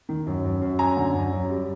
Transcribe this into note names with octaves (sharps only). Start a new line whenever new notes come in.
D#3
F#2
F#2
F#2
F#2 G#5 A#5
D3
F#2
F#2
G3